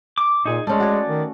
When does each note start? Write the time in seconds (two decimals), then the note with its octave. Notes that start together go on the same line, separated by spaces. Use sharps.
0.18 D6
0.46 A#2 D#4 G#4
0.67 G#3 A3 C#4 D5
0.80 F#4 C#5
1.08 D#3